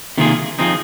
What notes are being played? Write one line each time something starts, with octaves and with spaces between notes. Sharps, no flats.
C3 D#3 A#3 F4 G#4
F3 C4 D#4 G#4